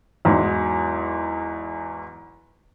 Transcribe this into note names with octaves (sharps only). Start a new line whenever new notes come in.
E2 G#2 F#3